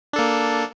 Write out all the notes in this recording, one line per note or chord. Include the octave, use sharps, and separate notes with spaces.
A#3 D4 A4